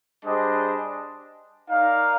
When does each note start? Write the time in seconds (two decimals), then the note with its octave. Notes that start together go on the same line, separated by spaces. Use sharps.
0.25 G3 D4 G#4 C5 D#5
1.70 D#4 A#4 D5 F5